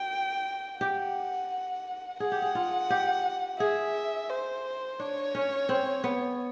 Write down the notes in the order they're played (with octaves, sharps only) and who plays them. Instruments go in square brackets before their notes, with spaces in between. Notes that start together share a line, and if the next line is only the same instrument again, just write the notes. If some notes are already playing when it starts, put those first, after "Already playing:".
Already playing: [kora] F#4 [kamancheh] G5
[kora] G4 [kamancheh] F#5
[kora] G#4 [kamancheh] F#5
[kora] G4
G#4
F4
G4
[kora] G#4 [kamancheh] E5
[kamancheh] C5
[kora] D4 [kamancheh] C#5
[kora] C#4
C4
B3